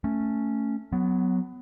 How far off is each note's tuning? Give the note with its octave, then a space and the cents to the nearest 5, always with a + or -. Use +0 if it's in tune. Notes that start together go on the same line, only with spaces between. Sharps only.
A3 +10 C#4 +0
F#3 +0 B3 +20